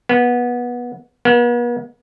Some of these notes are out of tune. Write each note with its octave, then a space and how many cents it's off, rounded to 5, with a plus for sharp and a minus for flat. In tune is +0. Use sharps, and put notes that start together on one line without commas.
B3 -20
B3 -45